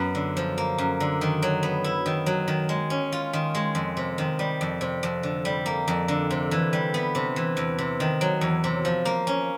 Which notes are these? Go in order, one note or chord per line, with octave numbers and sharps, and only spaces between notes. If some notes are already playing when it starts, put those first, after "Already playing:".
Already playing: F#2 F#3 B3
D3
F3
A#3
F#2
D3
D#3
F#3
B3
E4
D#3
F#3
D#3
G#3
C#4
F4
D#3
G#3
F2
C3
D#3
G3
F2
C3
F2
D3
G3
A#3
F2
D3
C3
E3
G3
B3
C3
E3
E2
C3
D#3
F#3
E2
C3
F3
A#3
C#4